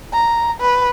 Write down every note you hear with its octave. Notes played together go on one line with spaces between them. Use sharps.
A#5
B4